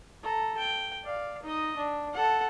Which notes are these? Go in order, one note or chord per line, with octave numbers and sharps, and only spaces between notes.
A4 A#5
G5
D5 F5
D#4 D#5
D4
A4 F#5